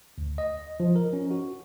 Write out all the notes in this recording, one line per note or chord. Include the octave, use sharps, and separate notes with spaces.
D2
D#5
F3
A#4
C#4
F#4